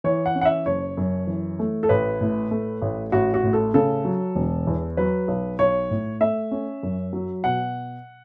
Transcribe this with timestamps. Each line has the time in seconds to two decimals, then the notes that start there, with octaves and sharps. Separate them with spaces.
0.04 E3 C#5
0.26 F#5
0.35 C#4
0.41 F#5
0.45 E5
0.66 F#1 C#5
0.97 F#2
1.27 E3
1.59 A3
1.83 A4
1.89 A1 B4
2.21 A2
2.51 A3
2.82 A1
3.12 A1 F#4
3.34 F#4
3.43 A2
3.53 A4
3.74 C#3 A4
4.05 F#3
4.35 E1
4.67 E2
4.97 F#3 B4
5.28 B1
5.59 B1 C#5
5.91 A2
6.20 A3 E5
6.51 C#4
6.83 F#2
7.13 F#3
7.44 B2 F#5